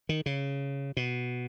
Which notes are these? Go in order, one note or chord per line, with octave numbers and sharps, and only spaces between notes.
D#3
C#3
B2